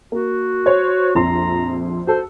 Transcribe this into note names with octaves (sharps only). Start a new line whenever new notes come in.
A#3 F#4
C5 C#5
A#1 F2 A#5 C6
F#4 A4 C5